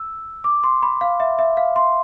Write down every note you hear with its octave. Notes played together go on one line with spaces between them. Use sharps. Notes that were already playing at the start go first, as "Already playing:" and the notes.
Already playing: E6
D6
C6
B5
F5
E5
E5
F5
C6